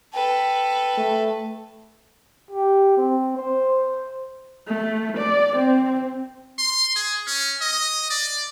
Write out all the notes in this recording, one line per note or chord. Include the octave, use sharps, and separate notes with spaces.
A4 B4 G5
A3
G4
C4
C5
A3
D5
C4
C6
G#4
C#4
D#5
D5